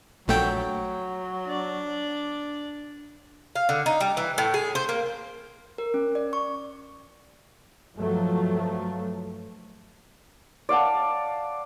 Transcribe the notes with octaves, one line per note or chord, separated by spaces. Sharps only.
A#1 F#3 A3 G5
D4 D5
F5
D3
D#4
G3
E3
A2
G#4
C5
A#3
A#4
C#4
D5
C#6
G2 F3 F#3 A3
D5 F5 F#5 A5